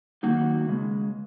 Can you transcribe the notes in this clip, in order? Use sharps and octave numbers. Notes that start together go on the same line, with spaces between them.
F#2 D#3 A#3 D#4 F#4
C#3 G#3